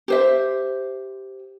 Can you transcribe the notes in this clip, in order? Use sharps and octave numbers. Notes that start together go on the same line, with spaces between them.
G4 C5 E5